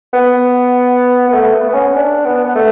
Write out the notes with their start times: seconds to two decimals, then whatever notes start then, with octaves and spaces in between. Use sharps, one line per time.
0.13 B3
1.28 B3
1.34 A3
1.54 B3
1.69 B3
1.74 C#4
1.94 D4
2.25 B3
2.45 B3
2.55 A3